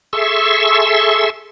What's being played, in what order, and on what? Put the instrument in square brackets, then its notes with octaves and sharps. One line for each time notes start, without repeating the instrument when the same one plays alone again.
[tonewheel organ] G#4 A4 E5 C6 C#6 E6